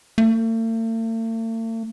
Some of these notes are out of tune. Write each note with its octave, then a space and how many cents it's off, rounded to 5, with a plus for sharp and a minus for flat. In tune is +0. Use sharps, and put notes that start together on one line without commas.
A3 +45